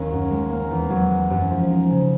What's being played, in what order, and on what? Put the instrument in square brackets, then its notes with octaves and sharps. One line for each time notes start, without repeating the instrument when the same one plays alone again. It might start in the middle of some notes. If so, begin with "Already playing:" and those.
Already playing: [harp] D#2 A#3 C#4
F#2
G#3
A#3
E2
F#3
G#3
F#2
F3
D#4
C#3